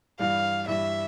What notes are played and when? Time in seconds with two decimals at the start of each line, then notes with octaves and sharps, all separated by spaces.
0.19 G2 E3 G3 F5
0.67 G2 E3 G3 E5